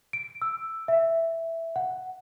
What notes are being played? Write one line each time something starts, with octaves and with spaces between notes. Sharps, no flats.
D7
E6
E5
F#5